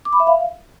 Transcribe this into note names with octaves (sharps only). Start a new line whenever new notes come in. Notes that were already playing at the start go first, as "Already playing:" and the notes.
D6
B5
E5
F5